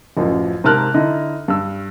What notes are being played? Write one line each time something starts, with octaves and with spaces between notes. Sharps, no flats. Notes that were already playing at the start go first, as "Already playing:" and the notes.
A1 F#2 F3
G#2 C3 A#4 A5 F6 F#6
D3 D#4 E4 D#5
G2 E6